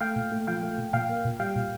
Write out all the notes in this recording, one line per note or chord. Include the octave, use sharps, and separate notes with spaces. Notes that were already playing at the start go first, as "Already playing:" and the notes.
A3 F5 G5
A#2
A3
F3 F5 G5
A3
A#2
A#2 F5 G5
A#3
A#2
G3 F5 G5
A#2